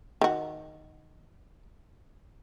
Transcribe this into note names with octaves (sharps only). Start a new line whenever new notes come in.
D#3 F#4